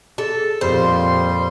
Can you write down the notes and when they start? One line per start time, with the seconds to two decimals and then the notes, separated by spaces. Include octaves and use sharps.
0.18 G#4 A4
0.61 F2 A#2 G3 G4 C5 C6